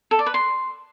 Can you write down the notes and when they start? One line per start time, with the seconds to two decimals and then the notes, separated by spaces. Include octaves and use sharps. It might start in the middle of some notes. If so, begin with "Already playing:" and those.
0.11 A4
0.19 D5
0.26 B4
0.34 C6